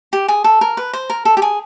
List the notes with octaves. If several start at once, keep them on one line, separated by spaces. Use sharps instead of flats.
G4
G#4
A4
A#4
B4
C5
A#4
A4
G4
G#4